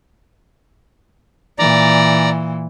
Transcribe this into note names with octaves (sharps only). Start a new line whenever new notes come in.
A#2 E3 D5 A#5